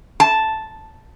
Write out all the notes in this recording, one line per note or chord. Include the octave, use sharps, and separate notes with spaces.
A5